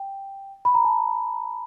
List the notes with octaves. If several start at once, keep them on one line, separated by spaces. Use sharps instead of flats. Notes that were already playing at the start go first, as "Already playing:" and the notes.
Already playing: G5
B5
A#5
A5